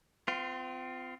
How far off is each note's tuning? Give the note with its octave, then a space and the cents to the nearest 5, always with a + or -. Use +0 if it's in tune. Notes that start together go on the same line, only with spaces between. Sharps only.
C4 -35 F4 +0